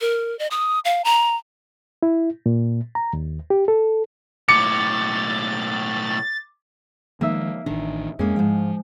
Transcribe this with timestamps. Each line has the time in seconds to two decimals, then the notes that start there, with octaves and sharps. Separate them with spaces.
0.01 A#4
0.39 D#5
0.51 D#6
0.85 F5
1.05 A#5
2.03 E4
2.46 A#2
2.95 A#5
3.13 D#2
3.50 G4
3.68 A4
4.49 B1 A2 D6 A6 C#7
7.21 D#3 F3 G#3 A#3 D#4 E5
7.66 A1 D#3 D4
8.19 F2 G#3 A#3 C#4
8.36 G#2 F3 F5